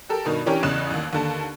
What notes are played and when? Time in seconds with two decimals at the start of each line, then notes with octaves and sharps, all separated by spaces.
0.09 G4 A4 A#4
0.25 G2 B2 D#3 D#4
0.46 E3 C#4 D4 G4 A#4 C#5
0.63 A1 E2 C#3 D#5 F#6 E7
0.90 A1 D#2
1.13 D#2 D3 A5